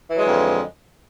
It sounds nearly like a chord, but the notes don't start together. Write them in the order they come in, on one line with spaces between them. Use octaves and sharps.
E3 F#3 G#3 D3 F2